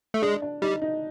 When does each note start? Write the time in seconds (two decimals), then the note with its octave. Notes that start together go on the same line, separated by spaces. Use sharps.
0.14 A3
0.22 G#3 D4
0.42 D4
0.62 G3 D#4
0.82 D#4